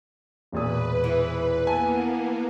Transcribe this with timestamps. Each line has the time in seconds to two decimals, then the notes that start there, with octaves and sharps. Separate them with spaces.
0.52 E1 A#2 B4 D#6
1.04 E3
1.67 A#3 B3 G#5 A5